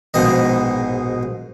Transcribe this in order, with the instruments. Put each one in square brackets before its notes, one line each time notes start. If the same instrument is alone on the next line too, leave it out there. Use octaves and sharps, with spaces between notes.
[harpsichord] A#1 G#2 B2 D#5